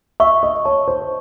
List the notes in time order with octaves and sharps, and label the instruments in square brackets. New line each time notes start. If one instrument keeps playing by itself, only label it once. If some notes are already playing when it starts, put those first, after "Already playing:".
[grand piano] E5 [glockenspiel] C#6
[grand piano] D#5 [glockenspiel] C#6
[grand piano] C#5 [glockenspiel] A5
[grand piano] C5 [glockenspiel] C#6